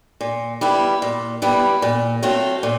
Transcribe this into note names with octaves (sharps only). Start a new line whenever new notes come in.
A#2
G3 B3 E4
A#2
G3 B3 E4
A#2
F#3 A3 C4 F4
A#2